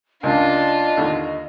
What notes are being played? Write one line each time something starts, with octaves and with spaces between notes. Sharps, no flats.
C#2 A#3 D4 F4 D#5
D#2 D3